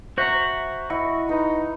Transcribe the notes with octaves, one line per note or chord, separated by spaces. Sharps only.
F#4 C5 E5 A#5
E4 D#5 F#5 C#6
D#4 B4